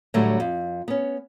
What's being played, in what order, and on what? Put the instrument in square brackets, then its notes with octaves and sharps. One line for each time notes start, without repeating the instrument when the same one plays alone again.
[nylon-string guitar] A2 D3 F#3 G3 A3
F2
B3 C#4